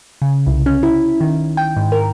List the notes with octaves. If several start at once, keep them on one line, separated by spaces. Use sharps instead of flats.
C#3
C2
C#4
E4
D#3
G5
G#2
A#4